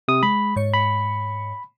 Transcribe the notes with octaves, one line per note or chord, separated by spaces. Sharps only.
C3 D#6
G#3 B5
G#2 C#5 C#7
B5